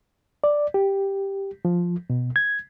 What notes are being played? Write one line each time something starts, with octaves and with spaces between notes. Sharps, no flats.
D5
G4
F3
B2
G#6